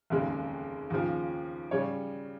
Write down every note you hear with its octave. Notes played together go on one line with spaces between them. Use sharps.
F1 D#2 C#3 G#3
D#2 C#3 F3
C#3 G3 C#5